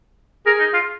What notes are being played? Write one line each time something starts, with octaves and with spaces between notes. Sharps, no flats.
G#4 A#4
D#4
F4